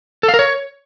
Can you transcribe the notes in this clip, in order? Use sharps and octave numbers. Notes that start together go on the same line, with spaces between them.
A4
F5
A#4
C#5